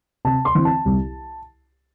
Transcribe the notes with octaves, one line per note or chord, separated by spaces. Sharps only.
C3 A5
C6
E3 C4
A5
C2